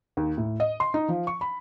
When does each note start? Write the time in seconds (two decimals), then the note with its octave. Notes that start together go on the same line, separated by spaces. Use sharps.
0.17 D#2
0.37 A2
0.60 D#5
0.80 C6
0.94 D#4
1.09 F3
1.27 C#6
1.41 B5